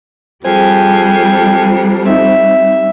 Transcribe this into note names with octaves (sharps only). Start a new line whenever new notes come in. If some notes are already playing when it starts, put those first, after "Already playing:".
F2 G3 G#4 C5 G5 G#5
C4 D#4 E5